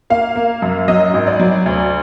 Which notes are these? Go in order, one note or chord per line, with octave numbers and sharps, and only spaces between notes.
A#3 F5
A#3
F#2
F#3 D#5
G#1
D5
F#3
D2